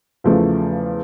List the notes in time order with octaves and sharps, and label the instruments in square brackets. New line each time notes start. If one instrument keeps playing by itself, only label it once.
[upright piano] E2 C#3 F3 A3